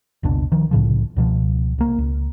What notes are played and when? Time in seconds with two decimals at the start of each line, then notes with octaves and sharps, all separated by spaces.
0.23 F#1 C#2 B2 D4
0.52 D#3 F3
0.71 C2 A2 C#3 F3
1.16 C#2 B2 F3
1.78 C2 A#3
1.98 C#2